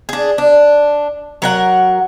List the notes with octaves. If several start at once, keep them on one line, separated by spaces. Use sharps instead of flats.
D4 G#4
D4
F#3 A#4 F#5